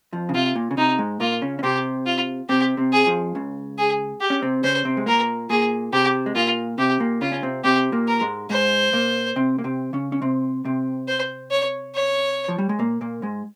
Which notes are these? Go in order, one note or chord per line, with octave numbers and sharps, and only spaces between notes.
F2 F3
C#3
C3 F4
A#2
C#3
C3 D#4
G#2 G#3
A#2 A#3 F4
C#3 C#4
C#4
C3 C4 G4
F4
C3 C4 G4
C3 C4
G#4
F2 F3
C#2 C#3
G#4
G4
C#4
C3 C4
C#3 C#4 C5
C3 C4
G#3
A#2 A#3 A#4
A#2 A#3 G#4
C3 C4 G4
G#3
A#2 A#3 F4
C3 C4 G4
A#2 A#3
C#3 C#4 F4
C#4
C3 C4
C3 C4 G4
A#2 A#3
A#4
G#2 G#3
G#2 G#3 C5
A#2 A#3
C3 C4
A#3
C3 C4
C#3 C#4
C#4
C3 C4
C3 C4
C5
C#5
C#5
F3
G3
G#3
A#2 A#3
A#2 A#3
G#2 G#3